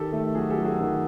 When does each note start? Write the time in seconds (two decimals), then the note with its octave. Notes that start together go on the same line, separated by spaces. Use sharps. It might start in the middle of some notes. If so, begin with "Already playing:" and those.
Already playing: D#3 G4 A4
0.13 A3
0.35 F#3 F#4 G#4
0.50 G4 A4
0.58 F#3
0.65 F#4 G#4
0.80 D#3 F#4